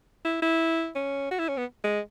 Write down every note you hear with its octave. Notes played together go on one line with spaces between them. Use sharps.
E4
E4
C#4
F#4
E4
C#4
B3
G#3